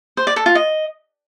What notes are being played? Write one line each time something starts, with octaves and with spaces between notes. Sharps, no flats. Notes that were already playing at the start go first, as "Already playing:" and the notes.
C5
D5
A4
F4
D#5